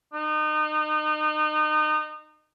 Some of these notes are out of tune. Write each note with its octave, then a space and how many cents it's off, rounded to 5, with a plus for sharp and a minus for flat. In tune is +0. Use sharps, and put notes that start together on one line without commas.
D#4 -30